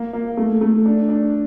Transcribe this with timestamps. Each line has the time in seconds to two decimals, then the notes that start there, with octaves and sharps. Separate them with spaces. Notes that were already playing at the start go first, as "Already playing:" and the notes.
Already playing: A#3
0.13 A#3
0.37 A3
0.61 A3
0.86 D4
1.09 D4